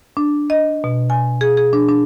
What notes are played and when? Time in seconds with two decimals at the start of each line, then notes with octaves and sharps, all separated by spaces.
0.17 D4
0.50 D#5
0.84 B2
1.10 G#5
1.41 G#4
1.57 G#4
1.73 D4
1.89 D4